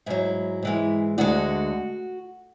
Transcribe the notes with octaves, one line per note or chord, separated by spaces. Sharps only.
G#2 F#3 E4
G#2 E3 G#3
D2 D3 G#3 F#4